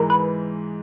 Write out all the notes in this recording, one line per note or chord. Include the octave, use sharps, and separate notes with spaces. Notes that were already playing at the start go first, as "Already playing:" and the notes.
Already playing: G#2 E3 G#3 A#4
B4